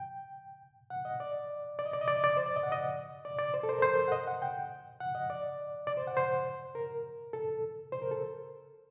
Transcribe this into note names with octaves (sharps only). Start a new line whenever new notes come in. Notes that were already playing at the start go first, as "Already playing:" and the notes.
Already playing: G5
F#5
D#5
D5
D5
D#5
D5
D#5
D5
D#5
D5
C5
D5
D#5
F#5
D#5
D5
D5
C5
A4
C5
A#4
C5
F#5
D#5
F#5
G5
F#5
D#5
D5
D5
C5
F#5
C5
A#4
A4
C5
A#4
A4